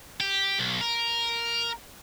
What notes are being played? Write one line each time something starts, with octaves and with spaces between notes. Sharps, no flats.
G4
B1
A#4